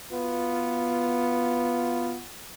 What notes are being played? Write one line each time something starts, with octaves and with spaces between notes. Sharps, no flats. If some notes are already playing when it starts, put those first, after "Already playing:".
B2 B3 F4